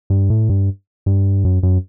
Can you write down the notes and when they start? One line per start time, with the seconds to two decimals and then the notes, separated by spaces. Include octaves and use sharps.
0.10 G2
0.30 A2
0.49 G2
1.06 G2
1.44 F#2
1.63 F#2